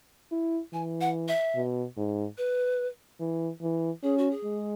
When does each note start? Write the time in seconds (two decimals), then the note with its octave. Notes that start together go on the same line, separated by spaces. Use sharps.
0.32 E4
0.73 E3 G#5
1.01 F#5
1.28 E5
1.56 B2
1.97 G#2
2.38 B4
3.20 E3
3.62 E3
4.03 C#4 G#4
4.18 F#4
4.31 G#4
4.44 G#3